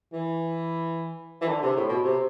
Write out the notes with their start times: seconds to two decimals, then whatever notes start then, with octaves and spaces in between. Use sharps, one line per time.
0.13 E3
1.41 E3
1.48 D3
1.62 C3
1.76 A2
1.89 B2
2.04 C3